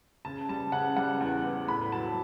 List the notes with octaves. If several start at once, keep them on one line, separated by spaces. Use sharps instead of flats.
C#3 A5
G3 A5
C#3 F#5
G3 F#5
E2
E2
A2 B5
F#3 A5